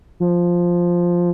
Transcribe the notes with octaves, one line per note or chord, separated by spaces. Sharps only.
F3